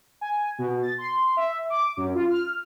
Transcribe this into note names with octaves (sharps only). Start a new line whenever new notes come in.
G#5
B2
A6
C6
E5
D6
F#2
F4
F6